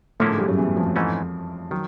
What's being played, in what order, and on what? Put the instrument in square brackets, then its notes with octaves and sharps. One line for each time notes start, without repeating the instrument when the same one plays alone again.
[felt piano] A2 A3 [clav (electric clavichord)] D3 F3 A#3 C#4 E4
[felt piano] G#2 G#3
G2 G3
F#2 F#3
E2 E3
F2 F3
[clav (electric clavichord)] G#2 E3 A3 C#4
[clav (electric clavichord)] D#3 [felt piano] F#3